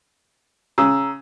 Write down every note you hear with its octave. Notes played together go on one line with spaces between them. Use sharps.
C#3 A#5 E6